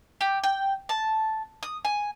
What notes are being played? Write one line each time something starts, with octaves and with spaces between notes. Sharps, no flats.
G4
G5
A5
D#6
G#5